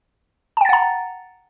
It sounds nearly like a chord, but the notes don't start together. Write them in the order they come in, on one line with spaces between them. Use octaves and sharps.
A5 G5 A6 F#5 A#5